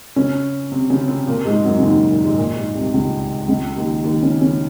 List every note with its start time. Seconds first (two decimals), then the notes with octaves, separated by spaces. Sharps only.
0.16 C#3 C#4
0.72 C3 C4
0.90 C#3 C#4
1.08 C3 C4
1.27 A#2 A#3
1.45 G#2 G#3
1.64 F#2 F#3
1.79 C#3
1.83 D#2 D#3
2.10 A#2
2.25 G#2
2.38 A#2
2.56 G#2
2.75 C2 C3
2.94 C#2 C#3
3.48 C#2 C#3
3.76 D#2 D#3
4.04 D#2 D#3
4.23 C#3 C#4
4.41 C#3 C#4